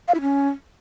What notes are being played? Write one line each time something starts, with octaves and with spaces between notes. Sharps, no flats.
F5
E4
C#4